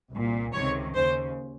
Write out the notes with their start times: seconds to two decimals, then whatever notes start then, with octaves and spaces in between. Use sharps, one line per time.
0.11 C2 A#2
0.53 C#2 C3 D#3 C#5
0.94 D#2 C#3 C5